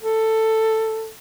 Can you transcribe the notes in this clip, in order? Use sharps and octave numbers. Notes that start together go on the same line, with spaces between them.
A4